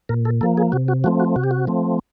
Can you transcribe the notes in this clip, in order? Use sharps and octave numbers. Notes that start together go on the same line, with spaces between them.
A#2 A#4
A4
F3 A#3 A4
G#4
C3 F#4
F#4
F3 A3 C4 F#4
F#4
C3 F#4
G4
F#4
F3 A3 C4